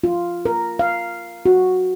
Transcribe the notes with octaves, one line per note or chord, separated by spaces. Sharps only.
F4
A#4
F5
F#4